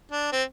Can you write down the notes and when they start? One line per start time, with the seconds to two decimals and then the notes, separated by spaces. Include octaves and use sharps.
0.12 D4
0.32 C4